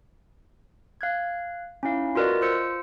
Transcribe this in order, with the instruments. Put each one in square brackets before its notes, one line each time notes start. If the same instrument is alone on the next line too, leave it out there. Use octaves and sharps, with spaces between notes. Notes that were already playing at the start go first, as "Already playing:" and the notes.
[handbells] F5 F#6 G#6
C#4 D#4 E4 F5
F4 F#4 A#4 B4 D5 D#5
F4 C5 E6 C#7